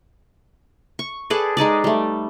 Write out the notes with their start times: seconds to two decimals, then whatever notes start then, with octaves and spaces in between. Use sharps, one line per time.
0.99 C#6
1.30 G#4 A4 B4 D5
1.57 G#3 D#4 G#4 D5
1.84 G3 A3